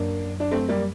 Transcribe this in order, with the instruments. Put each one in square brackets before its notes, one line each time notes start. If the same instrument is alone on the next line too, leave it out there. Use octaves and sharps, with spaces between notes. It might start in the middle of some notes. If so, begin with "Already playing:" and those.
Already playing: [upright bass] F#2 [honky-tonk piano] A#3 D4
[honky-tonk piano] D4
A3 C4
G3 A#3